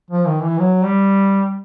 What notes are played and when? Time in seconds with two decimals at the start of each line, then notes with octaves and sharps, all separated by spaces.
0.10 F3
0.26 D#3
0.43 E3
0.59 F#3
0.84 G3